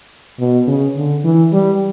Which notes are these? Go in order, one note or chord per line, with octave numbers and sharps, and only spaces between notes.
B2
C#3
D3
E3
G3